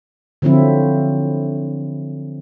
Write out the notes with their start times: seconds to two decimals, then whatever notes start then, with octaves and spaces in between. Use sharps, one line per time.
0.42 D3 F3 F#3 C4 E4